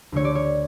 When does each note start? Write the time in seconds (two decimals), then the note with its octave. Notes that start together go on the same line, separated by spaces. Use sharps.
0.12 D2 D3 A3 C#5
0.25 D5
0.35 C#5